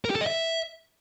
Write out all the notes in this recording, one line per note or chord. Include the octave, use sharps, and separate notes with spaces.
A#4
G4
A4
D#5
E5